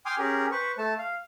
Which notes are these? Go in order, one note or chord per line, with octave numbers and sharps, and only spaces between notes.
G5 G#5 C6 D6 D#6 F6
C#4 G4 G#4 A#4
B4 C5 C#6
A3 A5
F5